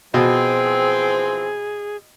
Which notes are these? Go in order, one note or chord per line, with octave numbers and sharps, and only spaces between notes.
B2 E3 F3 C4 G#4